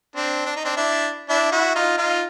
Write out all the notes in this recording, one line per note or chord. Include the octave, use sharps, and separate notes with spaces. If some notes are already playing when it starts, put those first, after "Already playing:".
C4 D4
D4
D#4
C4 D4
D4 E4
D4 E4
E4 F#4
D#4 F4
D#4 F4